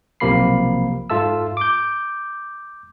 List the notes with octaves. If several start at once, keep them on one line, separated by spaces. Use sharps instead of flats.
B1 C3 F3 A#3 B5 C7
G#2 F4 A4 E5 A5 E6
D6 G6